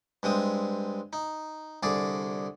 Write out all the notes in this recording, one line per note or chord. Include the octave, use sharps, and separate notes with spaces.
G2 G#3 C4 D#6
D#4
C2 D3 G#4 D5